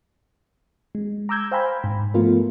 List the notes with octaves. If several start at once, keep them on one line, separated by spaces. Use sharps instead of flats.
G#3
A#5 D6 E6 G6 G#6
C5 F5 G5 G#5 A#5 B5
G#2
F3 A3 B3 F4 A#4